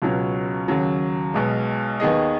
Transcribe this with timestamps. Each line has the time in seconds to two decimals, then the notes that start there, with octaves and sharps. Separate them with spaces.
0.02 C#2 B2 F#3 C#4
0.68 D#2 C#3 F#3
1.34 B1 B2 G#3
2.00 D#2 D#3 B3 G#4 D#5